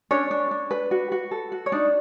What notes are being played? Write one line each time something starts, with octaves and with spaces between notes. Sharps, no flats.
C#4 D4 C#5
D4
D4
B4
F#4
F#4
A4
F#4
C#5
D4 D#4 D5